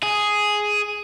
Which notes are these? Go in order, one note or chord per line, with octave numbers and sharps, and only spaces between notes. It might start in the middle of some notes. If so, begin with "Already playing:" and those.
G#4